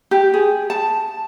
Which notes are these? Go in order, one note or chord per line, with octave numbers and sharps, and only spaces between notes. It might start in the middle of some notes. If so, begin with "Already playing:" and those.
G4
G#4
A5